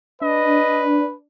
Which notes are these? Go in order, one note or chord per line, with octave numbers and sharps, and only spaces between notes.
D4 B4 D#5